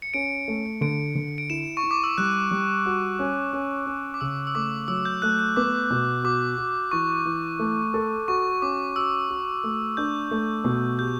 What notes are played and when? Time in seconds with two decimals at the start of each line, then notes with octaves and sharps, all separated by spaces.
0.02 C#7
0.14 C#4 D7
0.48 A3
0.81 D3 D7
1.15 D3
1.38 D7
1.50 E4 E7
1.77 C#6
1.83 E4
1.91 D6
2.04 E6
2.18 G3 F#6
2.51 G3
2.86 F#4
3.19 C#4
3.53 C#4
3.86 C#4
4.14 D6
4.21 C#3 E6
4.47 E6
4.55 A3 D6
4.88 F#3 E6
5.05 G6
5.22 A3 F#6
5.39 F#6
5.56 B3 D6
5.91 B2
6.24 F#4 D6
6.58 F#4
6.91 E3 C#6
7.25 E3
7.59 A3
7.94 A4
8.28 F#4 C#6
8.62 C#4 D6
8.96 F#4 E6
9.29 F#4
9.64 A3
9.97 D4 G6
10.31 A3
10.64 B2
10.99 G4 G6